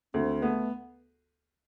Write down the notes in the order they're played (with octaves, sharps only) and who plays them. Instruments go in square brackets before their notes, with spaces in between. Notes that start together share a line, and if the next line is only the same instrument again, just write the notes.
[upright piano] D2 [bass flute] C4
[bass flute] A3 [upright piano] B3